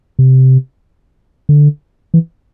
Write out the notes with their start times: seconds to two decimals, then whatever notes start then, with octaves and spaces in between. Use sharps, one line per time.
0.19 C3
1.49 D3
2.14 E3